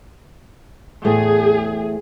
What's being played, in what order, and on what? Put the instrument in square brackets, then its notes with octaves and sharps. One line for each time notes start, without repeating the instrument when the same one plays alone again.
[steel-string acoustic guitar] E2 A2 A3 [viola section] G#4